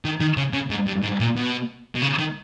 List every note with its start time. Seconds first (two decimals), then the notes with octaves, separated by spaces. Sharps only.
0.05 D#3
0.20 D#3
0.37 C#3
0.54 C#3
0.70 G#2
0.87 G2
1.03 G#2
1.20 A#2
1.36 B2
1.95 B2
2.02 C#3
2.19 D#3